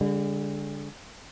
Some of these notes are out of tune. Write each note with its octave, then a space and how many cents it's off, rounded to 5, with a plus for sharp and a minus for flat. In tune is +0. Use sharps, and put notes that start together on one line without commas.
D3 -20 G#3 -45